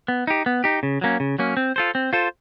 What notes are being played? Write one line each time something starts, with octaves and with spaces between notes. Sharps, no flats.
B3
D#4 G4
B3
D#4 G4
C#3
F#3 A#3 C#4
C#3
F#3 A#3 C#4
C4
F4 A4 C5
C4
F4 A4 C5